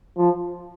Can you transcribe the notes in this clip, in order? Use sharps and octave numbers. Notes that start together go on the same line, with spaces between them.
F3